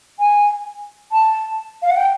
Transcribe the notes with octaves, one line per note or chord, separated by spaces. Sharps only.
G#5
A5
F5
F#5
G5